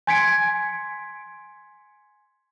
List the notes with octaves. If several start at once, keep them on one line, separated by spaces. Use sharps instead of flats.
G#5 C6 G#6 B6 C#7 D7